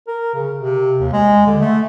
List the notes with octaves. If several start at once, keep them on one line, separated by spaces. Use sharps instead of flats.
A#4
C#3
C3
D#2
G#3
D3
A3